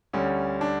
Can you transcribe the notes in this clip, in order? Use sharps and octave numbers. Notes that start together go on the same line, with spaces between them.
D2 D3 G3 C#4
D4